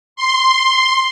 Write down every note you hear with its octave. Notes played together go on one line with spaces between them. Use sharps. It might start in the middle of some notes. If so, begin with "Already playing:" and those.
C6